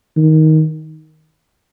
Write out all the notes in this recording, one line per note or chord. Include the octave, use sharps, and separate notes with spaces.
D#3